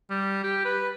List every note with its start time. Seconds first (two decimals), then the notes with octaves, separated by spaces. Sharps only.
0.10 G3
0.44 G4
0.65 B4